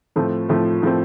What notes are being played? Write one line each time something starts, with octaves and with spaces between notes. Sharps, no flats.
A2 F3 A3 C4
A2 F3 A3 C4
A2 F3 A3 C4